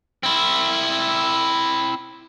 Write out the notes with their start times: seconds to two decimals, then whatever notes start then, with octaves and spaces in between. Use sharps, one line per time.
0.23 C4 E4